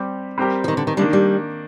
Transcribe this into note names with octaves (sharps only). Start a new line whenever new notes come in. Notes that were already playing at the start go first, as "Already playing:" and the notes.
Already playing: G3 C4 G4
G3 C4 G4 A#4
F3
D#3
D3
D#3
D#3 G3 A#3 D4
G3